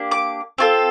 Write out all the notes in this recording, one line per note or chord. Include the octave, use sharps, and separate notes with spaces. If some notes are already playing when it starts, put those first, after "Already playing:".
Already playing: A#3 D4 G4
D6
C4 F4 A4